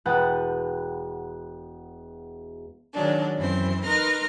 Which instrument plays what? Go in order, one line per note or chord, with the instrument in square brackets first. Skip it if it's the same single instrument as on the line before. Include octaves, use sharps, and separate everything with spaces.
[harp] E1 B4 F#5 G5 A5 D#6
[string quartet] D#3 F#3 G#3 D4
F#2 E3 F#3 C4 C5
D#4 A#4 B4 A#5 C6 F6